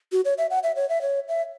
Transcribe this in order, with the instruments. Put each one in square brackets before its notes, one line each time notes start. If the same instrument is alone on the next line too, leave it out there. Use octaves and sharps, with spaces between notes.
[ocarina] F#4
C#5
E5
F#5
E5
C#5
E5
C#5
E5